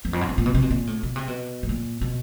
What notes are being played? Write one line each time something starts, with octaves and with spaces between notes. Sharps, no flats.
E2
F2
F#2
E2
A#2
B2
C3
B2
A#2
A2
B2
C3
B2
A2
A#2
B2